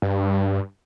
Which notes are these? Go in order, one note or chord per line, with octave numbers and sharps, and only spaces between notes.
G2